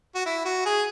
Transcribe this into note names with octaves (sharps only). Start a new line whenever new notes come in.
F#4
E4
F#4
G#4